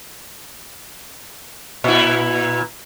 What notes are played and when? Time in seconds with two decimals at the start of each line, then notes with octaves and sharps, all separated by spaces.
1.84 A#2 E4